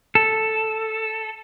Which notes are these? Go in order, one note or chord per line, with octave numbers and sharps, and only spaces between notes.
A4